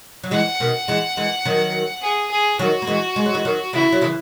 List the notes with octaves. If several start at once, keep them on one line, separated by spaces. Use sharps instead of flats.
F#3
E3 G#3 F#5
B2 D#3
E3 G#3
E3 G#3
D#3 F#3
G#4
G#4
D#3 F#3 F#4
A#3
E3 G#3
G#3
F#3
E3 G#3
D#3 F#3
C#3 E3 E4
F#3
C#3 E3